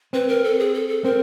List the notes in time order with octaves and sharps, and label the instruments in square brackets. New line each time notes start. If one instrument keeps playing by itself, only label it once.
[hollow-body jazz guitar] C4 [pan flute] B4
[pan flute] A#4
A4
G#4
A4
A4
[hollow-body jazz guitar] C4 [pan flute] A#4